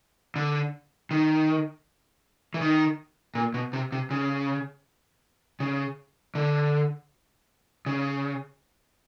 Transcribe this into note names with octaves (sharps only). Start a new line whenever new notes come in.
D3
D#3
E3
D#3
A#2
B2
C3
C3
C#3
C#3
D3
C#3